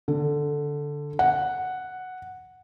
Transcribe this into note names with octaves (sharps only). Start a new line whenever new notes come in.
D3
F#5